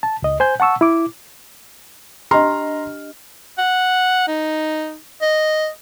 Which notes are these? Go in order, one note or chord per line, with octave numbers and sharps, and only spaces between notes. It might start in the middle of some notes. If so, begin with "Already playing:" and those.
A5
C#2 D#5
C5 G#5 G6
F#5 A5 C#6 E6
E4 D6
D4 G4 D#5 A#5 C6 F6
F#5
D#4
D#5